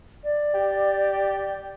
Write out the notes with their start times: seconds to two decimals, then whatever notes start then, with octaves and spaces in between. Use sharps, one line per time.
0.23 D5
0.54 G4